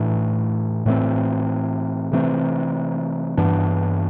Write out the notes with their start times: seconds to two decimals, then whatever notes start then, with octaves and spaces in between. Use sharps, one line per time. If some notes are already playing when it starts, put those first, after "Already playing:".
Already playing: A2 E3 A3 D4
0.86 A2 E3 A3 C4
2.12 C3 E3 A3 C4
3.37 G2 E3 B3 D4